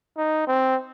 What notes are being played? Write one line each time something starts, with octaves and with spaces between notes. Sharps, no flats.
D#4
C4